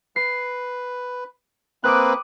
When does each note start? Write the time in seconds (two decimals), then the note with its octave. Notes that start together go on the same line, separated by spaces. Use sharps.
0.16 B4 C7
1.84 A#3 C4 B4 D6 D#6 F#6